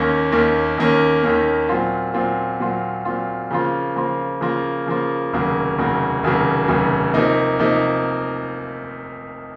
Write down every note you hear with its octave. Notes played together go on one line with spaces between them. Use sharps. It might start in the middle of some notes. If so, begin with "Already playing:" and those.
Already playing: D#2 D#3 A#3 C#4
D#2 D#3 A#3 C#4
D#2 D#3 A#3 C#4
D#2 D#3 A#3 C#4
A#2 F#3 C4 F4
A#2 F#3 C4 F4
A#2 F#3 C4 F4
A#2 F#3 C4 F4
C#3 F3 A#3 F4
C#3 F3 A#3 F4
C#3 F3 A#3 F4
C#3 F3 A#3 F4
F1 D#2 C#3 F#3 A#3
F1 D#2 C#3 F#3 A#3
F1 D#2 C#3 F#3 A#3
F1 D#2 C#3 F#3 A#3
C3 F3 A#3 D#4
C3 F3 A#3 D#4